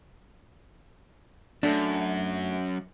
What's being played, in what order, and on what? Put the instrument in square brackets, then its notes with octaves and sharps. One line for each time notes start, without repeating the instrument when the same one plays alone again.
[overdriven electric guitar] F#2 [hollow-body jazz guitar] A3 D4